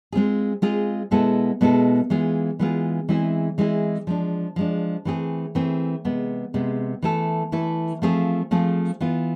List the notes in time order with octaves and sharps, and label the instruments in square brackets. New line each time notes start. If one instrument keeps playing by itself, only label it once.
[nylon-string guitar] G#3 C4 F4 G#4
G#3 C4 F4 G#4
B2 G#3 B3 E4 A4
B2 G#3 B3 E4 A4
E3 G#3 B3 F4 G#4
E3 G#3 B3 F4 G#4
E3 G#3 C4 E4 G#4
E3 G#3 C4 E4 G#4
F3 G#3 D4
F3 G#3 D4
E3 A3 C4 G#4
E3 A3 C4 G#4
C3 G#3 B3
C3 G#3 B3
E3 A3 E4 A4
E3 A3 E4 A4
F3 A3 C4 F4 G#4
F3 A3 C4 F4 G#4
E3 B3 F4